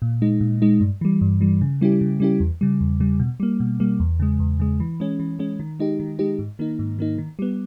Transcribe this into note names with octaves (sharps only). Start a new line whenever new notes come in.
A#2
G#3 D#4
A#2
G#3 D#4
G2
E3 G3
G2
E3 G3
C#3
G3 C#4 E4 G4
C#3
G3 C#4 E4 G4
E2
C#3 G3
E2
C#3 G3
B2
G3 A#3
B2
G3 A#3
E2
C#3 G#3
E2
C#3 G#3
E3
G#3 C#4
E3
G#3 C#4
D#3
G#3 D#4 G4
D#3
G#3 D#4 G4
G#2
D#3 A#3 D#4
G#2
D#3 A#3 D#4
D#3
G3 B3